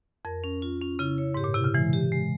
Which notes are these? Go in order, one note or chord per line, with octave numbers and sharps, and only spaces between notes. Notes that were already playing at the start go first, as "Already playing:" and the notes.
F2 A#4
C#4
F4
C#4
C#3 E4
C#5
G#2 G4
A#2
C3 E4
C#3
E3 G#3
G4
G#3